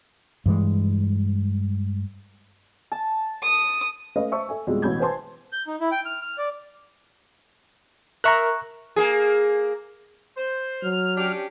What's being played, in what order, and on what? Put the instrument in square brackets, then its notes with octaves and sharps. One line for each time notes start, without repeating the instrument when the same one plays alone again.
[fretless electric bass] G2 E3 G#3
[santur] A5
[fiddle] D#6
[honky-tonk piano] A3 C#4 B4 D#5 F5
C5 E5 A5 C#6 E6
A4 E5 G#5
F2 B2 F3 G3 G#3
A1 B2 B5 G6 G#6
B4 C5 G#5 A5 C6
[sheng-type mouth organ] G6
D#4
E4
G5
F6
F6
D5
[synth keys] A#4 E5 [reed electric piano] A#5 C#6 F#6
[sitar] A#3 G#4
[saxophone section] C5
[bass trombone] F#3 [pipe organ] F6
[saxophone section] C#4 D4 G4